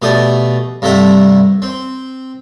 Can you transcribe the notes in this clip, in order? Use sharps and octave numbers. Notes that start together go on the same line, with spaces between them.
B2 A3 G4 D5 D#6
G2 C3 A3 E5 F#5 A#5
C4